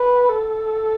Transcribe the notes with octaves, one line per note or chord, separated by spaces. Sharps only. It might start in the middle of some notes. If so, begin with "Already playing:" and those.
Already playing: B4
A4